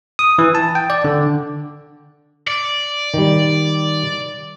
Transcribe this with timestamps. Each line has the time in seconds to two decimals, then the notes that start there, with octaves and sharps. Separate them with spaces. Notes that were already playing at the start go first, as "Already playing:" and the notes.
0.19 D#6
0.38 E3
0.55 A5
0.75 G5
0.90 D5
1.04 D3
2.47 D5
3.14 D#3 G3